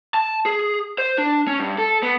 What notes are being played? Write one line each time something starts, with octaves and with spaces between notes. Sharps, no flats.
A5
G#4
C5
D4
C#4
G2
A4
B3